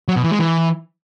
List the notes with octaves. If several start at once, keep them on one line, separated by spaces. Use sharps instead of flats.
F#3
B2
E3
G#3
E3